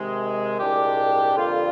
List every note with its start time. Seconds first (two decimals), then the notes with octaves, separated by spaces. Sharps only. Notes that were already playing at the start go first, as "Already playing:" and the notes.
Already playing: C3 D#3 G#3
0.59 C2 A#2 G#3 D4 G4
1.35 F2 D3 G3 A#3 F4